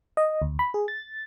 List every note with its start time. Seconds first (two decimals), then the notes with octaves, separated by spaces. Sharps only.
0.17 D#5
0.42 D2
0.59 B5
0.74 G#4
0.88 A6